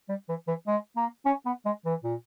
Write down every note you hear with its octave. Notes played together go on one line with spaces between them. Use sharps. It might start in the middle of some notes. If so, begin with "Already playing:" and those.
G3
E3
E3
G#3
A#3
C#4
B3
G#3
E3
A#2